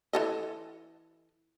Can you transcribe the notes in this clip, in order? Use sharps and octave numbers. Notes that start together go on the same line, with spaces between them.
E3 A4 D#5